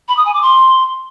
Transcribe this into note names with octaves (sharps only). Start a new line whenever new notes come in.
B5
D#6
G#5
D6
C6